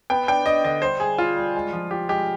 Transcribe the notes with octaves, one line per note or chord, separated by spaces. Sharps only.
B3 G5
D4 G5
D4 D#5
D3 D#5
G3 C5
G3 G#4
G3 F4
G3
G#3
F3
F4 G4
G#3 G4